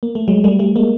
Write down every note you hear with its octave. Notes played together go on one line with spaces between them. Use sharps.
A#3
A3
F#3 G#3
G3 A3
G3 A3
G#3 A#3